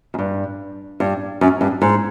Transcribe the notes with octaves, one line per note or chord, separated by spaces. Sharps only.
F#2
G2
G2
F#2
G2
G#2